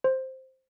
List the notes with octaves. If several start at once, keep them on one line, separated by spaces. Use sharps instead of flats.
C5